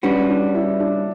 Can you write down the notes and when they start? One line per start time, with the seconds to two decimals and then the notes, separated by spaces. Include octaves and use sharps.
0.03 G3 C#4 D4 F#4 B4
0.30 D4
0.55 E4
0.80 D4